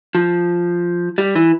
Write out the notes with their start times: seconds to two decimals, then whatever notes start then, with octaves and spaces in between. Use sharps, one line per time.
0.15 F3
1.18 G3
1.35 E3